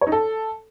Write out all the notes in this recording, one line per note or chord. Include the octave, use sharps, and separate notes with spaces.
C#5
D#4
A4